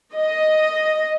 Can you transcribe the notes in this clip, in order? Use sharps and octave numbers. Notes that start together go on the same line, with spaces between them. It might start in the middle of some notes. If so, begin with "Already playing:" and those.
D#5